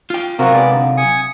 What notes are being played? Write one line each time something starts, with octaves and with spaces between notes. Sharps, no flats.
F4 G5
C3 F#3 C4 F#4 A#4 F5 F#5 A#5
G#3 B3 D5
D3
G#5 D#6 C#7